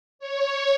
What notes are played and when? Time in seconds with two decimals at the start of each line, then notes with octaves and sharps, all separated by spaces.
0.19 C#5